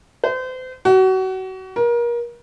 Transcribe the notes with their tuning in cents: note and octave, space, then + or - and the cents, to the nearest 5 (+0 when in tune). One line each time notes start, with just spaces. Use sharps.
C5 -35
F#4 +30
A#4 +30